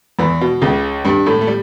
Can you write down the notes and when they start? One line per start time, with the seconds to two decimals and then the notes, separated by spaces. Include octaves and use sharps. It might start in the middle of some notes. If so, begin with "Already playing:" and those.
0.19 E2 E3
0.41 B2
0.62 C#2 C#3
1.05 G2 G3
1.26 A2 A3
1.41 A3
1.47 G3